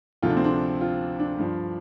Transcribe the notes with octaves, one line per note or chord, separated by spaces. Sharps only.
D2 C3 F3 F4
D4
C4
D4
F4
D4
G2 F3